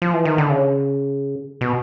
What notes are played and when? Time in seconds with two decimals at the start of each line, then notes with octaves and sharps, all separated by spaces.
0.02 F3
0.14 E3
0.25 D#3
0.38 D3
0.50 C#3
1.61 B2